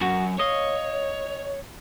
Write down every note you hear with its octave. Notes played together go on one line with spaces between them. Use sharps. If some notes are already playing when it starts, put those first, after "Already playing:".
F#2 F#4
C#5 D#5 F5